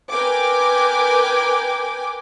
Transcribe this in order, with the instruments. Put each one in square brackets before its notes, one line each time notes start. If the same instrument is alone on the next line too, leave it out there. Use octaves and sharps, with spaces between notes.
[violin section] A#4 B4 G5 G#5 D6